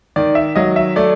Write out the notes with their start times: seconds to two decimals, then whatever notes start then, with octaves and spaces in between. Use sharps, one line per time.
0.16 D#3 D5
0.35 E5
0.55 F#3 D#5
0.76 E5
0.96 A3 D5